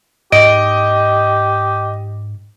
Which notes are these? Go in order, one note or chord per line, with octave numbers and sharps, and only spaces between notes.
G#2 G4 D#5 D7